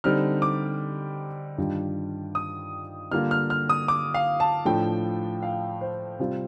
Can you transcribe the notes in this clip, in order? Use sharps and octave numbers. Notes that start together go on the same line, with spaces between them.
D3 G3 C4 D#4 F6
D6
G2 D#3 G3 D4 F4
D#6
D3 G3 A#3 F4 F6
F6
F6
D#6
D6
F5
A5
A2 F3 A3 D4 G5
F5
C5
C3 G3 C4 F4